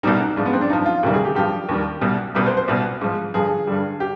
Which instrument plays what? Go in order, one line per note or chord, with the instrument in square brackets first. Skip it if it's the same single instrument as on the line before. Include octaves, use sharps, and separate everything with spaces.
[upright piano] C2 B2 G3 D#4
D#4
G#2 F3 D4
B3
C4
D4
G2 F3 D#4
F4
D2 C3 D#3 G3
G#4
G4
G2 F3 G4
D#2 D#3 G3
C2 B2 G3
C2 B2 G3 B4
C5
C5
C2 B2 G3 B4
G#2 F3
G2 D3 F3 G#4
G2 D3 G3
G4